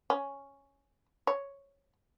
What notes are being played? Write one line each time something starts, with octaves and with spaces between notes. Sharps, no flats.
C#4
C#5